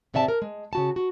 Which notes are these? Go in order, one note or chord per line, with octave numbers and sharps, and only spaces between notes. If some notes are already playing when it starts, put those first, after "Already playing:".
G#2 C3 D5 E5 G#5 A5
A#4
G#3
C#3 F#4 A5
F#4